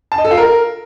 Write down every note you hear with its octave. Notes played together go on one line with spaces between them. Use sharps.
A5
D#5
A4
F4
A#4